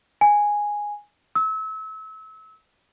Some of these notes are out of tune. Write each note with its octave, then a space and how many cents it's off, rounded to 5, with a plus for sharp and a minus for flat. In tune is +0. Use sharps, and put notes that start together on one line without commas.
G#5 -5
E6 -30